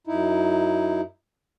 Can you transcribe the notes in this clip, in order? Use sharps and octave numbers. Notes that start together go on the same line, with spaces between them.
F#2 D#4 E4